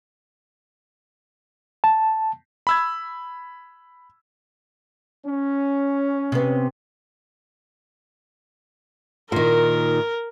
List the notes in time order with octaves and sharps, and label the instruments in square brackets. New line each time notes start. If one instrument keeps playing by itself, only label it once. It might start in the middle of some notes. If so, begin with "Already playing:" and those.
[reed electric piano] A5
[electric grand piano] B5 E6 G#6
[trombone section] C#4
[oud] C3 B3
[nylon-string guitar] A#2 D#3 [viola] A#4